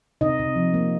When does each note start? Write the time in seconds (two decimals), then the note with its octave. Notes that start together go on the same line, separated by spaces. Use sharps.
0.21 C3 D#4 D#5
0.39 C3
0.56 F3
0.74 A#3